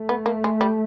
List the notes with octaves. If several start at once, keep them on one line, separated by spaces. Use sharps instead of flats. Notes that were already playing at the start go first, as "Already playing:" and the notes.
Already playing: A3
B3
A#3
G#3
G3